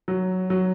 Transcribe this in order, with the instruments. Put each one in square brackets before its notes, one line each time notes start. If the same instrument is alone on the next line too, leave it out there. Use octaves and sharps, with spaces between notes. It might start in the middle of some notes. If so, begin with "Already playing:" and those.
[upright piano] F#3
F#3